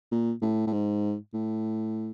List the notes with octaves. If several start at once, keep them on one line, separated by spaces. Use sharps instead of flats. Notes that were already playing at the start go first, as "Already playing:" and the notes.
A#2
A2
A2
G#2
A2